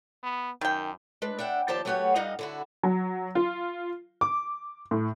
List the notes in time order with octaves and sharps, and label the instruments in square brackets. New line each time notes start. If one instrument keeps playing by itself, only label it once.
[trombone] B3
[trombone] F#2 [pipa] D#3 G5
[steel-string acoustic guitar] G#3 D4 B4
D4 E5 F#5 G5
D#2 F3 G4 C5 D5 A5
F#3 A3 B3 F#4 G4 C#5
G2 G3 D#4 D#5 F5 F#5
D3 E4 F#4
[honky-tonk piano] F#3
F4
D6
A2